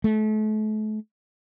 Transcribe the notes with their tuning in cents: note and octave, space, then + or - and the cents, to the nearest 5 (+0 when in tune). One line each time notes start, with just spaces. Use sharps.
A3 -35